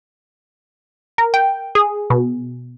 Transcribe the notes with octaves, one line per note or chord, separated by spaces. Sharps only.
A#4
G5
G#4
B2